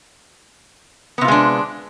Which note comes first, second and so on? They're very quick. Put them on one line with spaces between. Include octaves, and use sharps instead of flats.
B3 C3 F4 G#3 D4